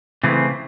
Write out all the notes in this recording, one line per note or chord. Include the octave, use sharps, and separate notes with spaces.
C#3 E3 A3 C4